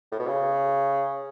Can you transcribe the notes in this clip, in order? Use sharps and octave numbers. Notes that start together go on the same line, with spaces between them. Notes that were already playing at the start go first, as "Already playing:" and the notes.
A2
B2
C#3